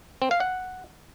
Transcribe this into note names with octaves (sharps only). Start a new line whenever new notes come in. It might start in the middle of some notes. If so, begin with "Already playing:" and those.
C4
F5
F#5